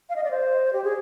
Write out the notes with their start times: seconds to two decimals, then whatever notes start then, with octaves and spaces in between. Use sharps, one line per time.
0.10 F5
0.16 D#5
0.24 D5
0.31 C5
0.73 G4
0.84 G#4